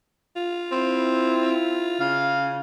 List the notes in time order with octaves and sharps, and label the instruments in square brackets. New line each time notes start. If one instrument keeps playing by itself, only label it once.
[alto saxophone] F4
[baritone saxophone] C4 [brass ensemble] E4
[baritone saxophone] C#3 [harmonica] F5